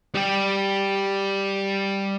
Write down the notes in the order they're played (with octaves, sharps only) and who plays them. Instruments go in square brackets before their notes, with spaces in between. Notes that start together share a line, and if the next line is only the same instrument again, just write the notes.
[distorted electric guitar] G3 G4